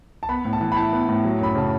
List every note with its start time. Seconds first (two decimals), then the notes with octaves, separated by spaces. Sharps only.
0.23 A5
0.29 B3 B5
0.45 A2
0.53 A5
0.61 E3
0.72 B5
0.77 E4 A5
0.93 B3
1.09 A2
1.24 F#3
1.41 F#2 B5
1.55 C#3 A5